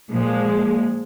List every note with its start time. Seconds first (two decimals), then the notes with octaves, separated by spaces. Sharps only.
0.10 A#2 F3 G#3